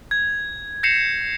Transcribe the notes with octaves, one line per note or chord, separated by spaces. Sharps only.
G#6
G6 A#6 C7 C#7 E7 F7